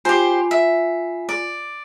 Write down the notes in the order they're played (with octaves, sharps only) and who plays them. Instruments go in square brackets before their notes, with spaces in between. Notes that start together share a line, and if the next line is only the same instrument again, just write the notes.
[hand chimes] F4 G#5 C7 [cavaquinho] G4 C5
[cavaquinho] E5
D5